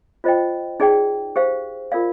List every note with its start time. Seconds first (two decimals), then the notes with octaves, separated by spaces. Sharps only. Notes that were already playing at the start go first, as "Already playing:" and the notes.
0.24 F4 C5 D#5 G5
0.80 D#4 G#4 D5 G5
1.36 G4 C5 F5
1.92 F4 A#4 D5 F5